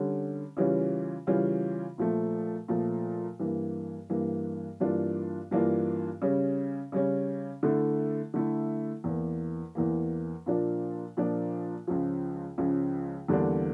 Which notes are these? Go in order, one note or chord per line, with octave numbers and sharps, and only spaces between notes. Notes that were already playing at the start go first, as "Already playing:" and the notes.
Already playing: D3 G3 C#4
C#3 E3 G3 C#4 F4
C#3 E3 G3 C#4 F4
A#2 F3 A3
A#2 F3 A3
G2 E3 A#3
G2 E3 A#3
G2 E3 A#3 D4 F4
G2 E3 A#3 D4 F4
C#3 G3 C#4
C#3 G3 C#4
D3 A3 E4
D3 A3 E4
E2 E3 A#3
E2 E3 A#3
A#2 F3 A#3 D4 F4
A#2 F3 A#3 D4 F4
C#2 C#3 F3
C#2 C#3 F3
E2 D3 G3 A#3 D4